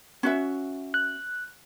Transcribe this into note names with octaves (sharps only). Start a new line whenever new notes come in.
C#4 F#4 E5
F#6